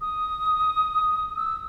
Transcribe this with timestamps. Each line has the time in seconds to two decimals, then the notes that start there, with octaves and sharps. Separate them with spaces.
0.01 D#6
1.36 E6